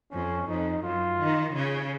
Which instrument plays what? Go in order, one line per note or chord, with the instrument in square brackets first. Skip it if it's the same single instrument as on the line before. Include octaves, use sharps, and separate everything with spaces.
[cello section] F2 [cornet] C#4
[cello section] F2 [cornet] D#4
[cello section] F#2 [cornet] F4
[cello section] D#3
C#3